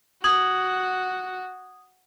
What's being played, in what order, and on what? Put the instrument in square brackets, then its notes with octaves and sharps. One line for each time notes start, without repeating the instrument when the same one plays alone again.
[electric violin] F#4 [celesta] D#6 G#6 F#7